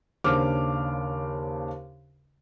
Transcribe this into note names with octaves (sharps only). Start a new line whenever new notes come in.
D#2 C#3 D4 C5 D6 F6